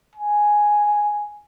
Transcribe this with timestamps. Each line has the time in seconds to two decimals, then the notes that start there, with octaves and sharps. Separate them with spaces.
0.15 G#5